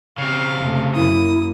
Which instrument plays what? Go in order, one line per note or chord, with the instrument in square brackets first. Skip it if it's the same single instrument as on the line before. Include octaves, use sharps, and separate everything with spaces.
[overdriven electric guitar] C#3 C4 [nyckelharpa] F5
[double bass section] F1 C3 A3
[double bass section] F#2 A#3 [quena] E4 [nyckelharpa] D#6